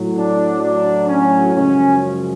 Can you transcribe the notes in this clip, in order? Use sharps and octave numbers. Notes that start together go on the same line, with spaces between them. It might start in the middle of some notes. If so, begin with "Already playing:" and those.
Already playing: A2 F#3
D4
D4
C#4
F#2 C#3 F3 G#3 C#4